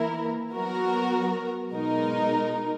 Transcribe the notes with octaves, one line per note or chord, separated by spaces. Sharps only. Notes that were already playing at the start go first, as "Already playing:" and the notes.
Already playing: E3 A#3 E4 A#4
F#3 B3 F#4 A#4
B2 G#3 D#4 A#4